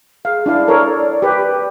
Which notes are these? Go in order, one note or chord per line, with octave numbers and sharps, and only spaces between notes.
G#4 F5
D4 E4 D5 F5
A4 A#4 C#5
G4 B4